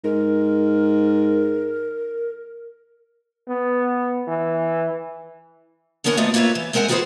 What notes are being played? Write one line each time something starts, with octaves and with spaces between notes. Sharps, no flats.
G#2 A#4
B3
E3
D3 E3 B3 A#4 C#5 F#5
D#2 A3 B3 F4 D#5
A#3 F4 B4 C#5 E5
E3
G#3 C4 A#4 D#5 F#5 G#5
D#3 F4 F#4 G#4 B4 C5